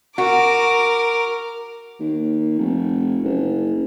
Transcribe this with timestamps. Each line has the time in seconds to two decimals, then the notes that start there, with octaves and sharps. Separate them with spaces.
0.18 F#4 A#4 D6
2.00 D#2
2.59 F1
3.24 F#1